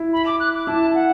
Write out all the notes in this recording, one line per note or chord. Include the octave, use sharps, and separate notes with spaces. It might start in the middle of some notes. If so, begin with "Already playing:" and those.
Already playing: E4
B5
D6
F#6
D6
E4 A5
F#5